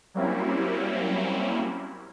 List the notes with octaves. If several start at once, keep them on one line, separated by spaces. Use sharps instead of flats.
F#3 G3 A#3 C4 C#4 E4